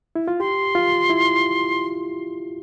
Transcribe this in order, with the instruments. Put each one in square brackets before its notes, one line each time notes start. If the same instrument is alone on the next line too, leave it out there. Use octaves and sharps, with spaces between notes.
[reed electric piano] E4
F4
[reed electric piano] G4 [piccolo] C6
[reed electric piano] F4
E4